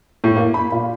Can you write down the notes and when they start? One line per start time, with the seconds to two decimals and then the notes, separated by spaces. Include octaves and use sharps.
0.24 A2
0.36 A#3
0.54 B5
0.72 A#2